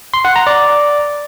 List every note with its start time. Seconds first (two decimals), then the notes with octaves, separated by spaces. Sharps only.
0.14 C6
0.25 F#5
0.36 A#5
0.47 D5